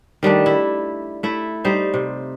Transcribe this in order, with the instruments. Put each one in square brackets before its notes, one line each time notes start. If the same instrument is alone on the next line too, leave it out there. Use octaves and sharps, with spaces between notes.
[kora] D#3 G3 A3 D4
E4
A3 E4
G3 D#4 C5
C3